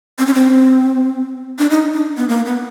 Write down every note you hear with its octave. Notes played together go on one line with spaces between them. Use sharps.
C4
C#4
C4
D4
D#4
D4
B3
A#3
B3